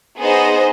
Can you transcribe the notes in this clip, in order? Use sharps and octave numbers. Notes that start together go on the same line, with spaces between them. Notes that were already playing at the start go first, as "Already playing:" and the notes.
B3 D#4 G#4 C5 D#5